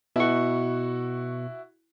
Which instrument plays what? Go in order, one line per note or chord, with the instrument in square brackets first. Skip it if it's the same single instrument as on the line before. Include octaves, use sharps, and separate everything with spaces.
[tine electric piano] B2 C#6 [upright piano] E4 F#4